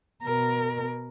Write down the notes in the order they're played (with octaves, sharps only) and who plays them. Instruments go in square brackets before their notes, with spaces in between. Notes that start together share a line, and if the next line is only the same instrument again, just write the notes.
[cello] B2 A#4